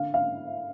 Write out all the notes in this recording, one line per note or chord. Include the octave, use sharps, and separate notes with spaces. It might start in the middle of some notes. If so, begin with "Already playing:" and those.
Already playing: D3 F5
F5